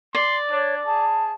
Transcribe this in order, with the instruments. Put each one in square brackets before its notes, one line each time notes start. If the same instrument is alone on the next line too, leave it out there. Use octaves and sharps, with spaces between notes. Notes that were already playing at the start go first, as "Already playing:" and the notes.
[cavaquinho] D5 [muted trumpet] C6
[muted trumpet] D4 [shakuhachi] C#5
[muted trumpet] G#4 [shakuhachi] A5